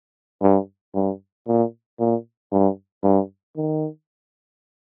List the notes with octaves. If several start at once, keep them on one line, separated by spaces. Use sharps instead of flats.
G2
G2
A#2
A#2
G2
G2
D#3